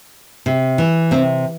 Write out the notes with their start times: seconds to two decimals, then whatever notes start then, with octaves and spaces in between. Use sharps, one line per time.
0.46 C3
0.78 E3
1.11 C3 C4